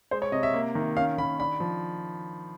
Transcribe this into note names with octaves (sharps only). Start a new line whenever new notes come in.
G#3 C5
C#5
C3 D#5
E5
A#3
D#3
C#4 F5
D#3 B5
D4 B5
F3